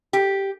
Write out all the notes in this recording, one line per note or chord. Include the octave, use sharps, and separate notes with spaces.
G4